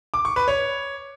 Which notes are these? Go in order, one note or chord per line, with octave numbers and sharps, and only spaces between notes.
D6
C#6
B4
C#5